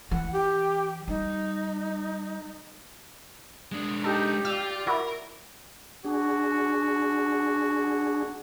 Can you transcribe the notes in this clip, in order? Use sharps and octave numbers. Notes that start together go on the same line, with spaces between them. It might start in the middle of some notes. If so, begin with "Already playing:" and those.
E3 F#5
G4
G3 D#4
G#3 D4 D#6
D#4 G4 A4
F4 D5 E6
E4 F#4 A#4
D4 F#4 G#4